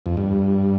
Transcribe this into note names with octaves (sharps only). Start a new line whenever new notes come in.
F2
G2